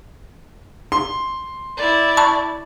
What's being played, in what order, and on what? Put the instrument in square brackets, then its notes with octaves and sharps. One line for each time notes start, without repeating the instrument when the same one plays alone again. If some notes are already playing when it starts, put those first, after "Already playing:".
[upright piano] C6
[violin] E4 D5
[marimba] A5 B5 C#6